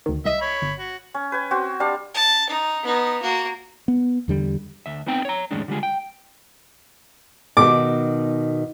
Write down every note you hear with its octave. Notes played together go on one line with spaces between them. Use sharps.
D2 D#3
C2 D#5 E5 D#7
C#5 B5
G1
F#4
C#4
B4 G5 G#5
C4 F#4
G3 D4 F5 A5
A5
D#4
B3 D#4
A#3 F#4
B3
E2 D3 G3
D2 E5
B3 C4 D#4 G5
C#5 A#5
F2 A2 D#3 G#3 C#4 D4
D3 G3 G#3 F4 G#4
G5
B2 D#3 F#4 D6